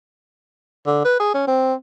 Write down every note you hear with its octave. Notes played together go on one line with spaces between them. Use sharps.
D3
B4
G#4
C#4
C4